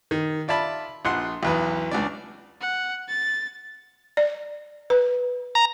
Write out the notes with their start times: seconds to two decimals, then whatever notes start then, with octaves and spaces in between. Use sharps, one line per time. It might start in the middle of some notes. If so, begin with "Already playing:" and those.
0.11 D#3
0.48 F4 D5 E5 A5 B5
1.05 A#1 F3 F#5 C6
1.43 B1 E2 B4
1.92 C#2 D4 D5
2.61 F#5
3.08 A6
4.17 D5
4.90 B4
5.55 A#5